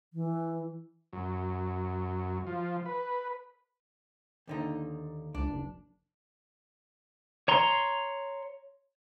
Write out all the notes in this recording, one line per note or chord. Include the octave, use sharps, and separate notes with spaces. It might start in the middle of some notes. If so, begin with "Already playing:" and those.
E3
F#2
F3
B4
D#2 D3 D#4
C#2 D4
F#1
C#5 A#5 C6